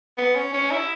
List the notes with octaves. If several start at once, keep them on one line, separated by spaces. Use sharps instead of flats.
B3
C#4
C#4
E4